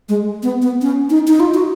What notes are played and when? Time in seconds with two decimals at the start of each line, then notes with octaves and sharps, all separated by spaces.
0.09 G#3
0.43 B3
0.62 B3
0.82 C#4
1.10 D#4
1.28 D#4
1.40 F4
1.54 F#4